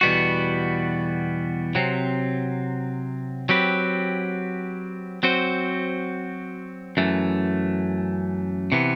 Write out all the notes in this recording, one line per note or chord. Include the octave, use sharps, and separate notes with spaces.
E2 B2 G3 B3 F#4
C3 F#3 C4
F#3 C4 G4 B4
F#3 C4 F#4 C5
F#2 E3 A3
C3 E3 B3